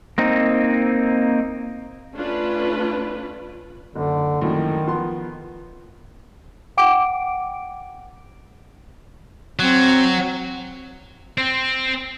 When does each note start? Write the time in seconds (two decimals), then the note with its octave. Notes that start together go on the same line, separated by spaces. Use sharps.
0.18 A#3 C4 D#4
2.14 A3 C#4 D4 F4 B4
3.96 F#1 D3
4.41 A#1 F#2 A2 D#3
4.87 F3 B3 C6
6.77 F#5 G5 D6 D7
9.59 F#3 C4
11.38 C4